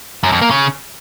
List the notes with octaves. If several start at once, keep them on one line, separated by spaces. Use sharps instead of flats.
F#2
F2
A#3
C#3